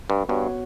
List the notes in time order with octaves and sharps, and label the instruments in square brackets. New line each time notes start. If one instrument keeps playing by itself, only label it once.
[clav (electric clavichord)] G2
[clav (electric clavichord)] G2 [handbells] B3 F#4 C#5 F#5